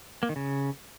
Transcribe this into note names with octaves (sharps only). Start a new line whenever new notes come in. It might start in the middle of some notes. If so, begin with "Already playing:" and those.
A#3
D#3
C#3